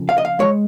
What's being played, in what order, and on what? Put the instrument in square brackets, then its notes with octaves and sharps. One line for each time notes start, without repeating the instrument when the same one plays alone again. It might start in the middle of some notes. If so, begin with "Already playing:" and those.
Already playing: [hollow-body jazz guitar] F2 C#3 F3
F5
D#5
F5
F3 G#3 C#5